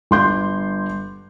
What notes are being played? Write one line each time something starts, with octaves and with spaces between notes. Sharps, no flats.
G1 C6 G6